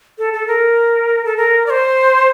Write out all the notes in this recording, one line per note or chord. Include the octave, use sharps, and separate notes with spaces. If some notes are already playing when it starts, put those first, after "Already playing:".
A4
A4
A#4
A4
A#4
D5
C5